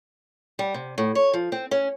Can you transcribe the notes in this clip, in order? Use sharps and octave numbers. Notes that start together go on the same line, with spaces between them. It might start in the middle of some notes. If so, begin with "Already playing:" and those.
G3
C3
A2
C#5
F3
C4
C#4